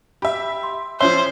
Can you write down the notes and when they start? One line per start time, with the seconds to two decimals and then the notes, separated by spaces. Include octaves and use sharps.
0.22 G4 E5 B5
0.63 C6
1.01 F3 C#4 C5 C#5 E5 C6 G7